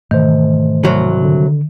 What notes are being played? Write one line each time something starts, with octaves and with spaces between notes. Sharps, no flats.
G#2 B2 D#3 E3 A3 C5
C2 F#3
D3